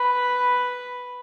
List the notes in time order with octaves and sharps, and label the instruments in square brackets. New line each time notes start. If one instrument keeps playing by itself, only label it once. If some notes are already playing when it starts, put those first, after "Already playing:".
Already playing: [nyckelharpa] B4